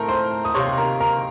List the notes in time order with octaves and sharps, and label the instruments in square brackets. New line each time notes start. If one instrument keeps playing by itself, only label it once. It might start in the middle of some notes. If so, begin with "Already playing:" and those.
Already playing: [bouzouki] A2 A3 C4 [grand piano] A#4 A#5
[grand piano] C5 C6
D#6
[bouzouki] C3 D#3 A#3 [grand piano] C#5 C#6
[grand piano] C6
A#4 A#5
A#4 A#5